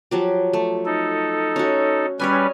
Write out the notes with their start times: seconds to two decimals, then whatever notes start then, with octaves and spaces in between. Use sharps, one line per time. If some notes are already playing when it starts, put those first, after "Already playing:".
0.11 F3 F#3 G4
0.53 A3
0.85 D#4 A4
1.56 C#4 F#4
2.20 G3 C#4 B4 C#5 D#5 G#5